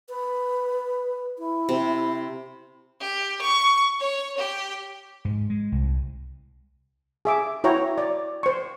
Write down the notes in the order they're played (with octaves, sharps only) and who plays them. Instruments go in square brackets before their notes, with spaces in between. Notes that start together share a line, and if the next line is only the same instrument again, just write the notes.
[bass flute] B4
E4
[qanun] C3
[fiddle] G4
C#6
C#5
G4
[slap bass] G#2
G#3
C2
[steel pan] G#4 E5 D6
E4 F#4 C#5 G5 A#5
D5
C5 C#6